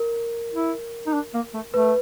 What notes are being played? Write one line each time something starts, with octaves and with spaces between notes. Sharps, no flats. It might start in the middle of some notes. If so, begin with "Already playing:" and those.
Already playing: A#4
E4
D#4
D4
A#3
A3
A3 B4